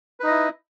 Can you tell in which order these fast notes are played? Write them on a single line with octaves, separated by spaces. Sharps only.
B4 D#4 D#5 E4